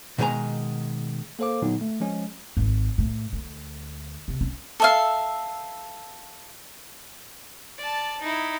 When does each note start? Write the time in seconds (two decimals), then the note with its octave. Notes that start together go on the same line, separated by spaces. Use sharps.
0.18 B2 D#3 G#3 D5 G#5 A#5
1.39 A#3 A4 C5 F5 D6
1.62 A#2 D3 F#3 B3 D#4
1.81 A3
2.00 F3 G#3 C#4
2.57 G#1
2.98 A2
3.33 D2
4.28 C3
4.41 C#4
4.80 A4 E5 F5
7.78 D5 A5
8.22 D#4 E4